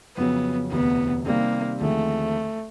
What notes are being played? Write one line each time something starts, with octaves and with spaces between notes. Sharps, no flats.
F2 C#3 F#3 B3
E1 D2 C3 B3
C3 D#3 G3 A#3 C4
D#2 D3 F3 G#3 A3 C4